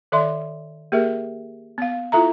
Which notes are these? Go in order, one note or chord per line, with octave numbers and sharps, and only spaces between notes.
D#3 A4 D5 E5 C6
A#3 G4 G#4 A#4 E5
B3 F5
E4 F4 A4 E5 A#5